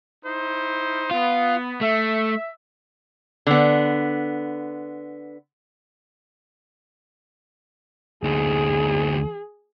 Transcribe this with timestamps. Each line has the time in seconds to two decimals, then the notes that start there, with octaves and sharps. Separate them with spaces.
0.24 D#4 E4 C5
1.11 B3 F4
1.81 A3 E5
3.47 D3 B3
8.24 D2 D#4 G#4